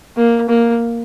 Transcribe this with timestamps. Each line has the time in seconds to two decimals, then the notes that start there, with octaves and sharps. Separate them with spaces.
0.17 A#3
0.49 A#3